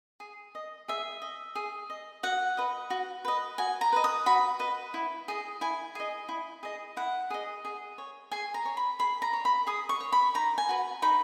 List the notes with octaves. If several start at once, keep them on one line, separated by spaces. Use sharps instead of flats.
G#4
D#5
G#4 E5
D#5
G#4
D#5
F#4 F#5
B4 D#5
F#4
B4 D#5
F#4 G#5
A#5
B4 D#5
D#6
F#4 B5
B4 D#5
E4
G#4 D#5
E4 G#5
G#4 D#5
E4
G#4 D#5
E4 F#5
G#4 D#5
G#4
C#5
G#4 G#5
A#5
C#5
B5
G#4 B5
A#5
C#5
B5
G#4 D#6
C#6
C#5
B5
D#4 A#5
G#5
F#4 B4
D#4 B5